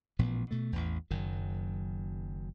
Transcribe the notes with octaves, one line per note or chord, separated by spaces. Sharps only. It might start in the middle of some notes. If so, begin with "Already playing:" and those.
A1 A#2 F3 B3
B2 A3
A1 E2
F#1 F#2 D#3